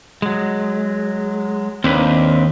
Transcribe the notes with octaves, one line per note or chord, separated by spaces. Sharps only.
F#3 G#3
D#2 C4 D4 B4